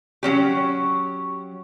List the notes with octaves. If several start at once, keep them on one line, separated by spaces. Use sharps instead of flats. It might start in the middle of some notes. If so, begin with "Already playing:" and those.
F#3 C#4 G4